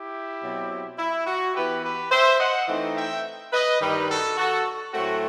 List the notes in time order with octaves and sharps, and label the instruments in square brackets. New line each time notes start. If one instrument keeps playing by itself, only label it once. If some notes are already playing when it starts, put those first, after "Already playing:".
Already playing: [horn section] E4 G4
B2 F#3 C4
E4
F#4
E3 B3 E4 G4 B4
G4 B4
C5 E5
D#5 F#5
E3 A3 C4 D#4
E5 G5
B4 D#5
G2 D#3 G3 D#4 G4 B4
F#4 A4
F#4 A4
A2 F#3 A3 C4 F#4